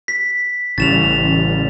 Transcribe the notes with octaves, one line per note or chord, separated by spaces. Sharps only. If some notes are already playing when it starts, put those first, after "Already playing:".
B6
A1 C#3 E3 G3 A6 E7 F7